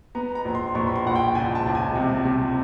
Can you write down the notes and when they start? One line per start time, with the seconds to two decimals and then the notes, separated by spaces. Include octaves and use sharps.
0.15 B3 A#5
0.35 A#5
0.45 A#1
0.55 C6
0.75 A#1 C#6
0.87 B5
0.96 C6
1.06 A#1 F#5
1.15 G5
1.35 C#2 G#5
1.55 A5
1.66 C#2
1.75 G#5
1.95 C3
2.25 C3